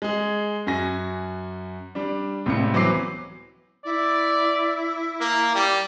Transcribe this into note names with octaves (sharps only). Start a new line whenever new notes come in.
G#3 G#4
F#2 F#4 G#5 A#6
G3 D4
C#2 A2 C3 G3 C#7
E3 F#3 B3 C5 D6 C7
E4 D5
A#3
G3